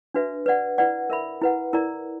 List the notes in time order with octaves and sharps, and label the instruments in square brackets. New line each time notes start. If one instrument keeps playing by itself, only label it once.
[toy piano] D4 F#4 B4 E5
B4 D5 F#5
E4 B4 D5 F#5
A#4 E5 B5
E4 B4 F#5
E4 A#4 D5 A#5